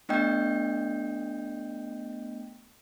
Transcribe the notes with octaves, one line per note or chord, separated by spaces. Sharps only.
A3 B3 D4 D#5 G5 G6